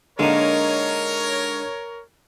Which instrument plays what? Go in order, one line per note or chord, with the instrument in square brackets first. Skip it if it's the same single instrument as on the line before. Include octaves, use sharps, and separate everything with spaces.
[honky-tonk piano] D3 A#3 D4 [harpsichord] G#3 D#4 [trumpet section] A#4 C#5